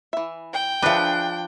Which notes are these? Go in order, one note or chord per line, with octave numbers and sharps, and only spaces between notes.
E3 E5
G5
F3 D4 G#4 B4 E5